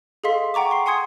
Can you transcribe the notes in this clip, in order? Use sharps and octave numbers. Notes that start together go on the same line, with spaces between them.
G#4 A4 D#5 F5 C6 B6
F#5 G5 A#5 C#6 D6
G5 C6 C7
F#5 G#5 C6 D#6 G#6 C#7